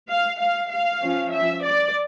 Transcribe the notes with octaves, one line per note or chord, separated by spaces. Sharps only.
F5
F5
F5
F3 C#4
E5
D5